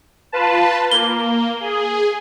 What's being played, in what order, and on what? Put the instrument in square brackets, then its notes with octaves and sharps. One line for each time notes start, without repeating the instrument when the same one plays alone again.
[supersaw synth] F4 B4 A5
[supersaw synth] A#3 [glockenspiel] G7
[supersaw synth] G#4